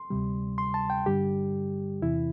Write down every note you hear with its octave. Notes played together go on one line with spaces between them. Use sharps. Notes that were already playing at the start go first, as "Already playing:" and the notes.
Already playing: C6
D2 C3 G3
C6
A5
G5
G2 D3 G3 G4
E2 C3 E3 E4